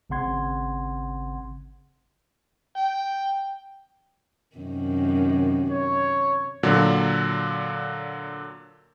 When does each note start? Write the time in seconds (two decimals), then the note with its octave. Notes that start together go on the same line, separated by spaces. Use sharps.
0.10 G#1 C#3 C4 F#5 C6 G#6
2.77 G5
4.56 F#2 C3 D#3
5.70 C#5
6.63 A#2 D3 F#3